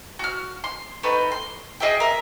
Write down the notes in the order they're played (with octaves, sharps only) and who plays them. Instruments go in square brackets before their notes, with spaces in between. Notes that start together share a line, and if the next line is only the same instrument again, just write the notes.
[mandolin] F#4 F6
C6
A3 D#4 B4 G5
C6
G#4 D#5 E5 G5
A#4 E5